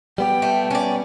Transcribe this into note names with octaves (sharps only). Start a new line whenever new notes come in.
G3 B3 G4 G5
A3
C#4 D5